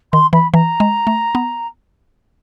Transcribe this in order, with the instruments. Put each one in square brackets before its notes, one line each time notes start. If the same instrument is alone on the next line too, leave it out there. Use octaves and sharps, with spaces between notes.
[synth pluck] D#3 [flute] C6
[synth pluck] E3 [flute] B5
[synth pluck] E3 [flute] A#5
[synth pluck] G#3
A3
B3